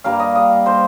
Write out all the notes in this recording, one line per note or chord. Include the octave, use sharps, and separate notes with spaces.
G2 G3 A#3 F5
D#5
D#5
C5